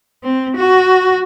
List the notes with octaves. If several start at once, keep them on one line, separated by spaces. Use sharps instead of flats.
C4
F#4